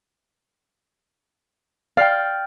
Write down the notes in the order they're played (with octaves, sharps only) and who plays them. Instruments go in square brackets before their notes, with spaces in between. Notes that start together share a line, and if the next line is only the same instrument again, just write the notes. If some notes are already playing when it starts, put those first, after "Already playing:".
[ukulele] D5 [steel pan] F5 [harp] G5 F6